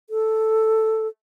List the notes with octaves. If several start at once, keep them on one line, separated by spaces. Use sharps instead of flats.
A4